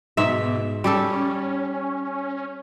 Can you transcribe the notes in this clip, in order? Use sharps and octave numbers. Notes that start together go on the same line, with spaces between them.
G#2 B2 E5
G3 C#4 G4 A4